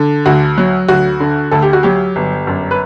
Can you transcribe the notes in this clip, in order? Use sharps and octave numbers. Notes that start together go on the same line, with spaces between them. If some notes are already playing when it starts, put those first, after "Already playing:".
Already playing: D3
D2 F#4
F#3
D2 F#4
D3
D2 A4
G4
F#4
F#3 G4
G1
F#2
B4